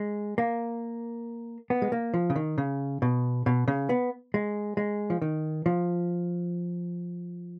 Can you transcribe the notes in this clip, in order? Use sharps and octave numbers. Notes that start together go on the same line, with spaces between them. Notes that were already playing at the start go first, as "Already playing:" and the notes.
Already playing: G#3
A#3
B3
G#3
A#3
F3
C#3
D#3
C#3
B2
B2
C#3
B3
G#3
G#3
F3
D#3
F3